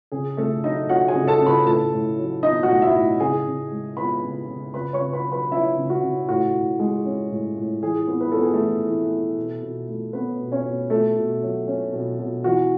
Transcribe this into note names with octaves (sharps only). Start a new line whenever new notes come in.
C#3 G#4
C#3 A3 A4
F#3 D#4 D#5
C#4 F#4 F#5
G#4 G#5
C#3
A4 A5
C#3
B4 B5
A2 A4 A5
A2
F#3
B3 D#4 D#5
F#4 F#5
A2
E4 E5
A2
C#3 G#4 G#5
C#3
G#3
B3 B4 B5
C#3
C#3
C#3 B4 B5
C#5 C#6
C#3
B4 B5
F#3
B4 B5
C#4 E4 E5
C#3
F#4
C#3
A2 F#4
A2
G#3
C#4
A2
A2
E3 G#4
B3
B4
B3 A4
G#4
A3 A4
E3
E3
B3
B2
B2
A3
B3 C#4 B4
B2
C#4 C#5
B2
B2 A3 A4
B2
F#3
C#4
B2
B2
E3 F#4